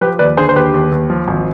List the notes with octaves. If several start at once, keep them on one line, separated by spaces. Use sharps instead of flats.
F3 G4 B4
D#2 B4 D5
D3 G#4 C5
C5
D#2 G4 B4
D#2
D#2
F3
G#1